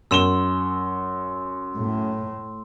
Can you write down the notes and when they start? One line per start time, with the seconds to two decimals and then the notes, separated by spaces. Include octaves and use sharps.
0.11 F#2 C6 E6 E7 G7
1.75 A2